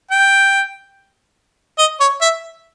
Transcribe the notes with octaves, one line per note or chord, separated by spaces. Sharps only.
G5
D#5
C#5
E5